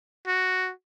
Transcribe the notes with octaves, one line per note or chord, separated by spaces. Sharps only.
F#4